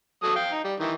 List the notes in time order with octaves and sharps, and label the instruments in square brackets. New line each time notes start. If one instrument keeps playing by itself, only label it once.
[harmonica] F#3 A4 D#6
F5 G5
D#4
G3
D#3 E3